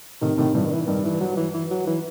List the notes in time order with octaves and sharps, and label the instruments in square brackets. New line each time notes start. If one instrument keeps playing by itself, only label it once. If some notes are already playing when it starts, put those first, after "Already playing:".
[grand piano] A2 C3 [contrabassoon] D#3
[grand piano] A2 C3 [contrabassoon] D#3
[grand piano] G2 [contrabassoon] E3
[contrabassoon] D#3
E3
[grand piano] G2 [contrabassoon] D#3
[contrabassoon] E3
F#3
E3
E3
F#3
E3